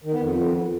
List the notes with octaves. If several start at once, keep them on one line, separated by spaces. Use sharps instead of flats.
D#3
B3
F2